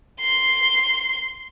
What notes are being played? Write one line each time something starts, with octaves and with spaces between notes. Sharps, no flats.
C6